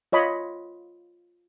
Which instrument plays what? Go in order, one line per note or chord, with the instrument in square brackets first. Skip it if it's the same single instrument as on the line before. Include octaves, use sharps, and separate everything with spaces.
[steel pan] F4 C#5 D#5 B5